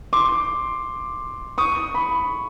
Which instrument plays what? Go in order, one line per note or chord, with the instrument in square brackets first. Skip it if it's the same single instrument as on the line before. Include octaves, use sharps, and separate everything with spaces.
[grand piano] C6 D6
C#6 D#6
B5 C#6